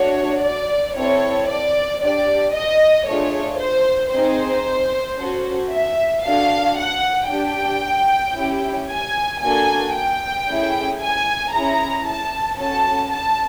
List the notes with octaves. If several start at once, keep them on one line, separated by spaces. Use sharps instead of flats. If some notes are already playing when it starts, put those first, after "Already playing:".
Already playing: A3 D4 F#4 C#5
D5
C4 E4 A4 C#5
D5
D4 G4 D5
D#5
A3 D4 F4 G#4 C#5
C5
C4 D#4 G#4 C5
C#4 F#4 A4
E5
D4 F#4 A4 F5
F#5
D4 G4 G5
C#4 E4 G4
G#5
A#3 D4 F#4 A4 G#5
G5
A3 C#4 E4 G#4
G#5
C#4 E4 G#4 A#5
A5
C#4 F#4 A4 A5
A5